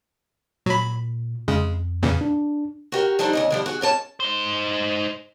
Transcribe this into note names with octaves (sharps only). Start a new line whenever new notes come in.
A#2 F#3 B5
F2 C#3 G#3
E2 A#2 C#3
D4
F#4 G4 A#4
F3 G3 A3 D4 D#4
D2 C#4 D#5
D3 F3 G3
F#4 G#4
G#2 C#4 A#4 A5
D#4 C5